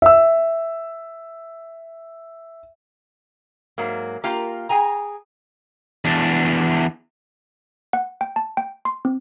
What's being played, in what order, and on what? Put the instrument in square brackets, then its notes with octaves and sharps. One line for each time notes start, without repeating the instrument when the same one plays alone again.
[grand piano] E5 E6
[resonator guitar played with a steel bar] G#2 F#3 A#3
A#3 F4 G4 A#4
G#4 G5 G#5 A#5
[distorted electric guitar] E2 D4
[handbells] F#5
G5
A5
G5
C6
C4